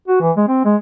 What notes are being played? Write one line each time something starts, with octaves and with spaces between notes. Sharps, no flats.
F#4
E3
G#3
C4
G#3